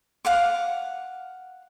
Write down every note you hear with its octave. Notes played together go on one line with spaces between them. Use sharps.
F5 F#5 D6